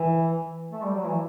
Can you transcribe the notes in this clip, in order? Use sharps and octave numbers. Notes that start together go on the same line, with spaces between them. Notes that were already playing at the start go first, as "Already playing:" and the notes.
Already playing: E3
A3
G3
F#3
E3